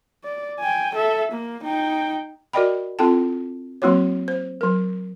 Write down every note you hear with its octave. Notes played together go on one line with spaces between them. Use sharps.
D5
G5 G#5
A4 E5
A#3
D#4 G5
F#4 A#4 D5 D#5 G5 B5
C4 E4 F4 A4 G5 A5
F#3 A#3 C4 E4 F#4 C#5
C5
F#3 A#4